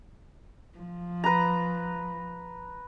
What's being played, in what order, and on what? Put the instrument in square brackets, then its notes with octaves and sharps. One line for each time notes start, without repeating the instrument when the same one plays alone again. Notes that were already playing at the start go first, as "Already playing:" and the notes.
[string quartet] F3
[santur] B4 A#5